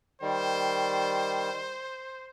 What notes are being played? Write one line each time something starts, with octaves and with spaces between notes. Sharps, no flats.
D#3 G3 C5